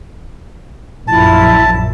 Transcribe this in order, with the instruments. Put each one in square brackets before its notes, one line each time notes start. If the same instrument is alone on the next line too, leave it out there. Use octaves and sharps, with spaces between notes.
[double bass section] A#1 F#2 A#2 [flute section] E4 F4 [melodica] A5